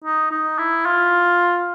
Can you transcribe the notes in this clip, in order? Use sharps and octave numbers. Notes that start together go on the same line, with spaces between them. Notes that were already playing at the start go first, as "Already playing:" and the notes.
D#4
D#4
E4
F4